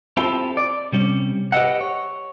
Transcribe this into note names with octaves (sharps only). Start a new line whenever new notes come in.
C4 E4 F4 G4 A4
D5
C3 G3 C#4
G4 B4 C5 D#5 E5 F#5
C#5